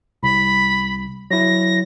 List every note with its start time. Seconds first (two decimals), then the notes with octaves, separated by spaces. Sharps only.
0.23 C2 B5
1.31 F#3 E4 A#6